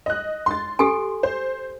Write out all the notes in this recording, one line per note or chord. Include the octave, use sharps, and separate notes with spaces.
D#5 F#6
C6 A6
G4 A4 G#5 C6
C5